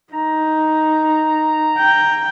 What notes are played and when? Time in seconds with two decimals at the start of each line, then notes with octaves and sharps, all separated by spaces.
0.13 D#4 A#5
1.78 G5